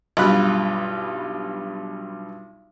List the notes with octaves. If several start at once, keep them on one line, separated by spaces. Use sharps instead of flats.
B1 G2 F4 B5 F#6